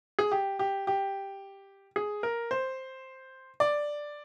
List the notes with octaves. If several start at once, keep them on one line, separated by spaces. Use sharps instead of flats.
G#4
G4
G4
G4
G#4
A#4
C5
D5